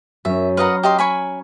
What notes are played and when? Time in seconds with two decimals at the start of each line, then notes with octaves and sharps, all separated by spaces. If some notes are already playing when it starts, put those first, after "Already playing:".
0.25 F#2 C#4 E5
0.57 B4 D#5 F5 F#5 A#5
0.83 G4 D#5 C6
0.98 C#5 G#5 B5